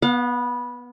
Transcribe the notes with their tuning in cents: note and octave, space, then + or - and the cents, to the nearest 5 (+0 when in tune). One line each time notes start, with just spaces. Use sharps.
B3 -15 F5 +35